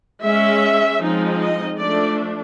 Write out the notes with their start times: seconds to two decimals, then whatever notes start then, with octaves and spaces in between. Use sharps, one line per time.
0.23 G#3 C#4 E5
1.00 F3 G#3 C4 D#4
1.40 D#5
1.78 F3 A3 D4 D5